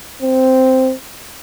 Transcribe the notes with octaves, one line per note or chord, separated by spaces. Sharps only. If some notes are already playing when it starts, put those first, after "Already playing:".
C4